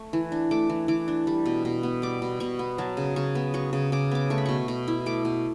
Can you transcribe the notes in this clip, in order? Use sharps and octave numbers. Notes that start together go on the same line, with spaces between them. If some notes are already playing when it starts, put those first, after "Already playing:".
Already playing: A3 C#6
E3
D4
A3 D6
E3
E3 D6
D4
G3
B2
B2
B3
G3 D6
B2
B2 C#6
B3
F#3 A5
C#3
C#3 C#6
B3
F#3 C#6
C#3
C#3 D6
B3 D6
A3 C#6
B5
B2 C#6
B2
E4
A3 D6
B2